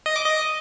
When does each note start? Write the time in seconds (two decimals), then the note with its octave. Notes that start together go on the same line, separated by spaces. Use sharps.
0.06 D#5
0.16 D6
0.25 D#5